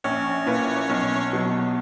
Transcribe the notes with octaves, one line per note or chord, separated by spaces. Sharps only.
A#1 C#4 C#5
A#2 A#3 E4 B4
B1
B2 F#3